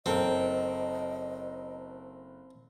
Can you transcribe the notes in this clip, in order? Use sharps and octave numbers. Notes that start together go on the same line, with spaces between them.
F#1 C4 A4 A#4 D#5